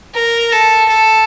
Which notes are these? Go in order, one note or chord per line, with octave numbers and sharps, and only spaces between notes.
A#4
A4
A4